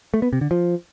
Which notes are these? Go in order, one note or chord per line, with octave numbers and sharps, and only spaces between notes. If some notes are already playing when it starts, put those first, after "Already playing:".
A3
B3
C3
D3
F3